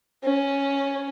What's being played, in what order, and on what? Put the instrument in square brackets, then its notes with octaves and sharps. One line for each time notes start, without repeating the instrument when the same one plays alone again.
[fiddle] C#4